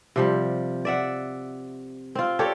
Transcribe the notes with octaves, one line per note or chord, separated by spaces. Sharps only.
C3 F3 G3
D5 E5 F#5
C4 F4
G4 A4 C#5 D5